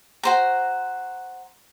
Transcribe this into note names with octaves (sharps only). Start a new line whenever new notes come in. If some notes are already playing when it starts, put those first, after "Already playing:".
F#4 C5 A#5